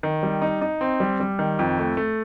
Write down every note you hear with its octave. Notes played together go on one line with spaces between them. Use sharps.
D#3
G3
D#4
D#4
C4
G3
G3
D#3
F2
A3
A3